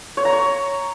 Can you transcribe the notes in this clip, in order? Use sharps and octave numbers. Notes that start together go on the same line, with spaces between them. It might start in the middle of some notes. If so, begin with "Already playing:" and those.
C#5
A#5
C#5